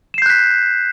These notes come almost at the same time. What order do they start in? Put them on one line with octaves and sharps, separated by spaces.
E7 C7 G6 F#6 B6